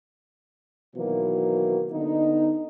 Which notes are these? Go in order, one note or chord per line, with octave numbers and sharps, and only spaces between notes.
B2 D#3 E3 F#3 A#3
D3 B3 D#4